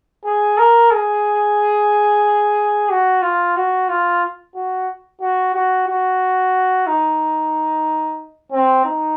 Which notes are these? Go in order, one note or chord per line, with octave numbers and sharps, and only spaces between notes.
G#4
A#4
G#4
F#4
F4
F#4
F4
F#4
F#4
F#4
F#4
D#4
C4
D#4